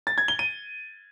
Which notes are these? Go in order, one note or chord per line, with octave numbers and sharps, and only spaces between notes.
A6
G#6
G7
D#7